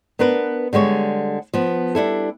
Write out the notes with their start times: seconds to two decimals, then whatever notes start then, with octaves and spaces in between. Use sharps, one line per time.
0.19 B3 D4 A#4 B4
0.73 D3 G3 G#3 C#5
1.54 F3 B3
1.95 G3 D4 E4 A4